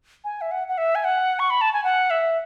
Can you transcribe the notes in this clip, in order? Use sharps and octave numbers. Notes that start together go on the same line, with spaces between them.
G#5
E5
F#5
F#5
E5
G#5
F#5
C#6
B5
A5
G#5
F#5
E5